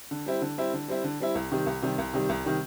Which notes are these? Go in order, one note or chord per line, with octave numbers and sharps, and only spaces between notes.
D3
G3 C4 E4
D3
G3 C4 E4
D3
G3 C4 E4
D3
G3 C4 E4
C2
C3 D#3 G3
C2
C3 D#3 G3
C2
C3 D#3 G3
C2
C3 D#3 G3